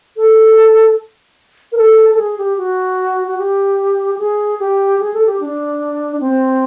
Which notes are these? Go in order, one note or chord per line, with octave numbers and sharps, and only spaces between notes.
A4
A#4
A4
A4
G#4
G4
F#4
F#4
G4
G4
G#4
G4
G#4
A4
G4
D4
C4